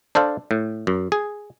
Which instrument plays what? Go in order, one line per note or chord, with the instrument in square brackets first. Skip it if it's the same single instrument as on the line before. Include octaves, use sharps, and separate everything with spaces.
[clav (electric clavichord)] D4 A4 C5 D5 F5
A2
F#2
G#4